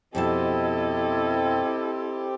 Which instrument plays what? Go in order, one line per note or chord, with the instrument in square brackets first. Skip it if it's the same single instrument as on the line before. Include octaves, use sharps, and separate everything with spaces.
[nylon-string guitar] F2 B2 A5 [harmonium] C4 G4 [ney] E4 [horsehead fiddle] A4 D#5